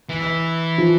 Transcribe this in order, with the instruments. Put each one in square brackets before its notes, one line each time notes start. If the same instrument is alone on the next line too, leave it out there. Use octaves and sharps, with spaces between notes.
[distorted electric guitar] E3
[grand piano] F3